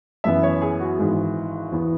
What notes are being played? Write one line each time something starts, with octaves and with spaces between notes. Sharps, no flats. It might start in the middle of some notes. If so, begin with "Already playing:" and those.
F#2 E3 B3 E5
C#5
G#4
F#4
G#1 G#2 E3
E2 E3 B3